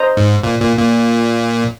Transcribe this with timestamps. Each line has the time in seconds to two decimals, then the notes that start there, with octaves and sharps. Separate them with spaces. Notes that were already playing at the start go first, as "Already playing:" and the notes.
Already playing: C5 D#5 A#5
0.17 G#2
0.43 A#2
0.61 A#2
0.79 A#2